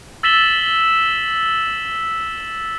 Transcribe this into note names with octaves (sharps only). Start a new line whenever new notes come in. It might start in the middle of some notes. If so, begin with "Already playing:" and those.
E6 A6 B6 E7 F#7 G7